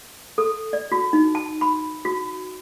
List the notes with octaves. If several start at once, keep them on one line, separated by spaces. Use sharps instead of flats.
A4
D5
F#4
D#4
A5
B5
F#4